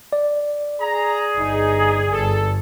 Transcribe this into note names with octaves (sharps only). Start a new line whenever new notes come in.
D5
G#4 A#5
G1 D#4
G1 A4